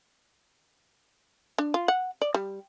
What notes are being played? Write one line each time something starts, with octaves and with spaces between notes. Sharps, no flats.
D4
F4
F#5
D5
G3